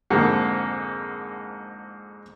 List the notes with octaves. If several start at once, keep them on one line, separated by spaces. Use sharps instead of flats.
F2 G#2 D3 A#3